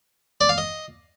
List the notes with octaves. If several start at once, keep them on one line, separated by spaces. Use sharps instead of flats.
D5
F5
D#5